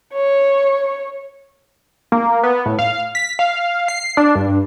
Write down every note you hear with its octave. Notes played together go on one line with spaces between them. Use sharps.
C#5
A#3
B3
A2
F5
B6
F5
C7
D4
G2